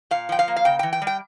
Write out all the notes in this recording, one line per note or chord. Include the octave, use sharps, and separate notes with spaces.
A#2 F5
F3 G5
F5
A#3
F5
C#3 G5
E3 G5
G5
G3
G5